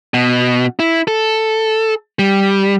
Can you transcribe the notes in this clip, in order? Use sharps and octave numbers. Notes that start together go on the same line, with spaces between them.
B2
E4
A4
G3